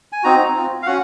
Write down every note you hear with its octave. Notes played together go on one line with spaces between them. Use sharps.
G#5
C4 D#4 F#4 A#5
C4 F4
F5
C#4 F#4 F#5